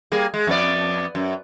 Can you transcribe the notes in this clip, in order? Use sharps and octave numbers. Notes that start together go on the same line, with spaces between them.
G3 A#3 G#4
G#3
F2 B3 D5
F#2